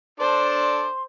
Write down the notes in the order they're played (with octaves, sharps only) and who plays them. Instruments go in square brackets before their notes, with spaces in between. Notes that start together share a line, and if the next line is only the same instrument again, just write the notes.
[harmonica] D4 A4 D5 [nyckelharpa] C5 [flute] C6